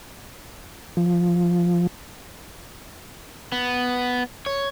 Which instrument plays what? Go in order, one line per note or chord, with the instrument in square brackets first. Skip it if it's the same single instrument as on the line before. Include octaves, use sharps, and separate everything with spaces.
[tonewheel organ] F3
[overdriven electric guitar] B3
C#5